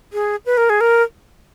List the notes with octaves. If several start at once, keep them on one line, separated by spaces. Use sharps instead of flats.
G#4
B4
A#4
G#4
A#4